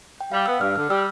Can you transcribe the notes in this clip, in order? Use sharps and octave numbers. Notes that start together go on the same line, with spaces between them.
G5
G3 F5
B3 E6
G2 F6
D3 F6
G3 E6